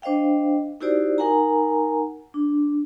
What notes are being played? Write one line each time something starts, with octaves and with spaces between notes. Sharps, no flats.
D4 C5 D#5 F5 G5
D#4 E4 F#4 G4 C5 D5
D#4 A#4 F#5 G#5 A#5
D4